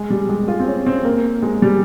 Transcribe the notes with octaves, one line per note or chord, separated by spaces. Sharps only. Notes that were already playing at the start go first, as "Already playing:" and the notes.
Already playing: G#3
G3
G#3
F4
C4
C#4
C4
A#3
G#3
G3